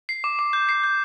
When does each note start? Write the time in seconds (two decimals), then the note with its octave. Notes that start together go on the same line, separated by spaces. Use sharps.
0.09 C7
0.24 D6
0.39 D6
0.53 G6
0.69 C7
0.84 G6